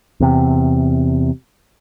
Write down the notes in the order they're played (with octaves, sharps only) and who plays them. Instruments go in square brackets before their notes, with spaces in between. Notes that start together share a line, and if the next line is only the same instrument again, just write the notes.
[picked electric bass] E2 C3